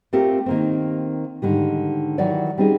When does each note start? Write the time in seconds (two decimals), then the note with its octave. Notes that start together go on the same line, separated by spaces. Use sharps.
0.13 A3 C4 F4 G4 A4 A#4
0.46 D#3 A#3 C4
1.42 G#2 D3 D#3 G3
2.18 D#3 E3 F#3 C#5 D5
2.58 G3 C4 C#4 D#4 G#4